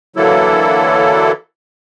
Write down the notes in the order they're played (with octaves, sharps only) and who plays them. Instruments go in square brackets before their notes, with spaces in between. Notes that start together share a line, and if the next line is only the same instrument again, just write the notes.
[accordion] D3 E3 F#3 A#3 E4 A4